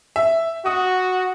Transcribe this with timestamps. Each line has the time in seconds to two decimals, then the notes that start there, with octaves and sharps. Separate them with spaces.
0.16 E5
0.66 F#4 D#6